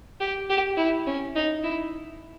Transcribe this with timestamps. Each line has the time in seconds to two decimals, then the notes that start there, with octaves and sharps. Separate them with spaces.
0.20 G4
0.50 G4
0.77 E4
1.06 C#4
1.35 D#4
1.63 E4